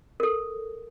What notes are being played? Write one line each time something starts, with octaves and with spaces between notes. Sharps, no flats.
A4 A#4